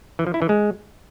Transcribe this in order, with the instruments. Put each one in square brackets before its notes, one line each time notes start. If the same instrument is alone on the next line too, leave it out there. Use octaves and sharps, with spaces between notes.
[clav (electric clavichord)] E3
F3
E4
E3
G#3